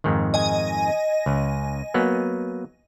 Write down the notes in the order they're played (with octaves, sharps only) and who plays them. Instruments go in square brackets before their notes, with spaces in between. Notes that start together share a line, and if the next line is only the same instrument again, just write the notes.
[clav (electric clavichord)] F2 G#2 D#3
[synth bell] D#5 G#5
[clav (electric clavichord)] C#2
F#3 A#3 B3